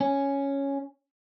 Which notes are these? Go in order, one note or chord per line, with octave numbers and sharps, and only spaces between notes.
C#4